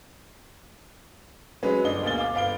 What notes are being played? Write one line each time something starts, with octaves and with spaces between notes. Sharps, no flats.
F#3 G#3 C#4 B4
G1 D4 D#5 G7
D2 B2 A#3 G#4 A6 G7
F5 D6
G1 F5 D7 G7